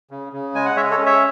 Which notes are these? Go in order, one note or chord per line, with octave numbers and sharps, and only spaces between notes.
C#3
C#3
G#3 G#5
F#5
G#3 C#5 E5
A4 C#5
C#4
C#5 E5